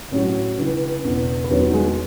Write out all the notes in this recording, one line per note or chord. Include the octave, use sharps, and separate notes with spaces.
A1 A2 F#3 C#4 C#5
C#2 C#3 E3
E1 E2 C#3
B4
E2 D#3 F#3 C#4 C#5
G#3 G#4